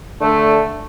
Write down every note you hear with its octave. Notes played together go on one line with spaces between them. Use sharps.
D3 A3